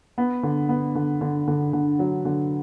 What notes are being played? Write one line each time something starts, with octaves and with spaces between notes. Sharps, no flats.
B3
D3
B3
D3
D3
D3
D3
F#3
D3